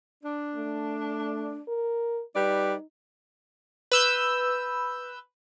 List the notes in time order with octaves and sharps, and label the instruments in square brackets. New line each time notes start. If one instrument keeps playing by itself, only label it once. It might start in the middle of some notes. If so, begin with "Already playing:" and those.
[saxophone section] D4
[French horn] A3
A#4
[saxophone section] G3 B4 D5 [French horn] D#4
[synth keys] B4 E6 G6